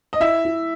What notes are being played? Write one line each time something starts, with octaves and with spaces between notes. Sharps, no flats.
D#5
E4 E5
E4